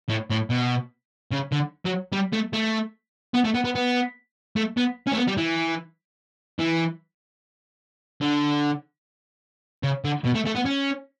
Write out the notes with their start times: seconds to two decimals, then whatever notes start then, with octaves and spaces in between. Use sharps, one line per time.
0.09 A2
0.30 A2
0.50 B2
1.31 C#3
1.52 D3
1.85 F#3
2.12 G3
2.33 A3
2.53 A3
3.34 B3
3.45 A3
3.55 B3
3.65 B3
3.75 B3
4.56 A3
4.77 B3
5.07 C#4
5.12 A3
5.16 B3
5.27 G3
5.37 E3
6.59 E3
8.21 D3
9.83 C#3
10.04 D3
10.24 B2
10.34 A3
10.45 A3
10.55 B3
10.65 C#4